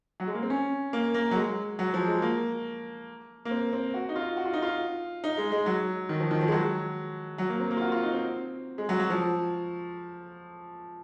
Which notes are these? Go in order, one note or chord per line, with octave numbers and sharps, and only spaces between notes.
F#3
G#3
A#3
C4
C#4
A#3
A#3
F#3
G#3
F#3
F3
G#3
A#3
A#3
C4
C4
F#4
D#4
F4
F#4
F4
D#4
F4
D#4
G#3
G#3
F#3
D#3
F3
D#3
F3
G#3
F#3
F#3
A#3
C4
A#3
F4
F#4
F4
D#4
C4
G#3
F#3
F#3
F3